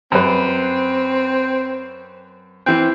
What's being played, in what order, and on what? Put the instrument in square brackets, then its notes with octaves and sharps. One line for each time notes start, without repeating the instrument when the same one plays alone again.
[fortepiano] F#2 B4 [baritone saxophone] C4
[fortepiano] E3 G5 [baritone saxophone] C4